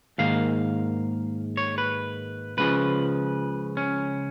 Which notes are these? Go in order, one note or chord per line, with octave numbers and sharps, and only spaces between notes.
G#2 D#3 A#3 F5
C#5
B4
C#2 C#3 F3 B4
C#4